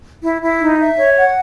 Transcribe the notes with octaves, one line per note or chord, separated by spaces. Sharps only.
E4
E4
D#4
E5
C#5
F#5